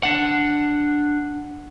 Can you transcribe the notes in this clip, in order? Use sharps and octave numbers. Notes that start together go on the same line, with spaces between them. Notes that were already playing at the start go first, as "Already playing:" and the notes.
D4 F#5